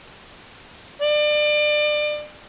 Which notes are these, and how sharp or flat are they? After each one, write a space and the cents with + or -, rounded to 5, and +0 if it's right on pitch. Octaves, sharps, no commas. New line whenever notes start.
D5 +30